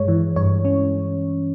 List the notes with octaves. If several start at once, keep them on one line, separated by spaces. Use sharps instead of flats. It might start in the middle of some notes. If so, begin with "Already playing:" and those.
Already playing: G2 G#3 C#5
E3
G2 C#5
C#4